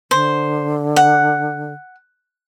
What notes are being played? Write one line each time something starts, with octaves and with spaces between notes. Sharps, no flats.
D3 C5
F#5